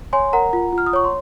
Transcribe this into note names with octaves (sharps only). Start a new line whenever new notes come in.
C#5 G#5 C6
A#4 F#5 A#5
F4
F4
F6
D#6
C#5 C#6
C6